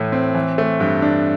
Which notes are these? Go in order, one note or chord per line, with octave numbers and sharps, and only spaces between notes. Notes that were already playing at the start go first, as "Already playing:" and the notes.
Already playing: A2 E3 A3
C4
E3
A3
G2
D4